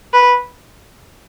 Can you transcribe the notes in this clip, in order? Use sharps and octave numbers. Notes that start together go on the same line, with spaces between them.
B4